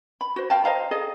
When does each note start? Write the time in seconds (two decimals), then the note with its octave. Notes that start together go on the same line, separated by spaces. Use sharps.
0.21 B5
0.36 F#4 C5
0.50 F5 G5 A5
0.64 C5 D#5 F5 A#5
0.91 G#4 A4 D#5